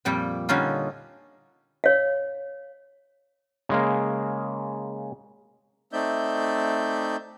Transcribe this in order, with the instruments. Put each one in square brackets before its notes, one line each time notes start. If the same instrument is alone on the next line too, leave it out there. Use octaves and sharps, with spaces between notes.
[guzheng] F2 A#2 G3 G5
D3 G3 C#4 D#4 F4
[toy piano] C#5 F5
[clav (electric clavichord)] C#3 G#3 A#3
[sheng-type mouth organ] A3 C4 D#4 D5 E5 G6